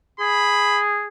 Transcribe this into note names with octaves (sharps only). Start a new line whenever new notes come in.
G#4 B5